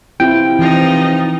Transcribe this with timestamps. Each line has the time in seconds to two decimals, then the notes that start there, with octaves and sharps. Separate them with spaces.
0.20 C3 E4 F4 G5
0.59 E3 F3 D#4